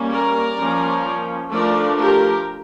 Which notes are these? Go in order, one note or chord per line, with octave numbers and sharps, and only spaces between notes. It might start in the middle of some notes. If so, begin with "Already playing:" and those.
Already playing: G3 A#3 C#4
A#4 D5
F3 A#3 C#4
F3 A3 D4 A#4 D5
G4 A#4